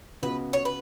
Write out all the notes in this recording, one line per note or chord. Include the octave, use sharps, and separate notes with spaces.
C#2 C#3 B3 F#4 B4
C#5
B4